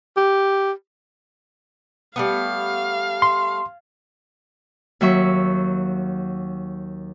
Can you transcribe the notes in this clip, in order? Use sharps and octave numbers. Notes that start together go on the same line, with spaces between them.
G4
G3 A3 B3 F5
C6
D#2 F#3 E5 C#6